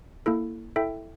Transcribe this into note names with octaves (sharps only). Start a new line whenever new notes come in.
A#3 E4 A4
E4 A4 E5 G5